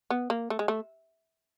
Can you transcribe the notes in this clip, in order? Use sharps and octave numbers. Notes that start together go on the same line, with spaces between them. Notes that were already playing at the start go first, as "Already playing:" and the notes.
B3
A#3
A3
G#3
A3